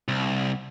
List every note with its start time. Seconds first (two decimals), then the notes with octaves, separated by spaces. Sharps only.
0.08 C2